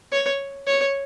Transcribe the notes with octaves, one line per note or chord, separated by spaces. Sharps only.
C#5
C#5